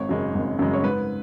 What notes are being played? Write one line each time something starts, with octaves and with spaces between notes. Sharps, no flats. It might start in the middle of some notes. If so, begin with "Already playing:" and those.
Already playing: G#1 C#5
F#2 C#3 G#3
G#1
F#2 C#3 G#3
C#5
G#2 B4